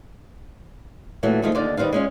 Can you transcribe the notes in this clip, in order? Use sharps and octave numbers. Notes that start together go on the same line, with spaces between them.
A#2 E3 F#3 A3
D#2 D#3 F3 G#3 A3 F4
D#2 D3 D#4 F4 D5
D#3 G3 C4 B4 F5
G#3 C#4 F4